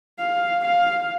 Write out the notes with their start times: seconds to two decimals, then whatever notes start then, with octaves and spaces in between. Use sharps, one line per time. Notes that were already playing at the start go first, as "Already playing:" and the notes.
0.19 F5
0.65 F5